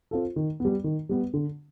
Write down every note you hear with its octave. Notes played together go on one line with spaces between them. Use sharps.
C4 F4 A4
D#3
G3 B3
D#3
G3 B3
D3